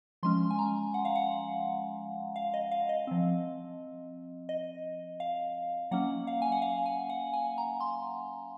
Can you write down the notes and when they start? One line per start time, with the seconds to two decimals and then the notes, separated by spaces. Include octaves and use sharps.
0.23 F3 G#3 C#4 C6
0.50 G#5
0.59 A#5
0.94 F#5
1.05 F5
1.15 F#5
2.36 F5
2.54 D#5
2.71 F5
2.89 D#5
3.07 F3 C4
4.49 D#5
5.20 F5
5.91 F#3 A#3 C#4 F#5
6.27 F5
6.42 G#5
6.52 F#5
6.62 F5
6.86 G#5
7.10 F#5
7.33 G#5
7.58 A#5
7.80 C6